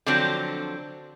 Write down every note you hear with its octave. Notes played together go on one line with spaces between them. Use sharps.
D3 F3 F#3 C4 D4